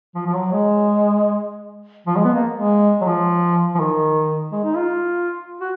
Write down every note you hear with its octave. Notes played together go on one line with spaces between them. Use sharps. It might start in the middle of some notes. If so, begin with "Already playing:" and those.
F3
F3
F#3
G#3
F3
G#3
B3
A#3
G#3
F#3
F3
F3
D#3
G#3
D#4
F4
F#4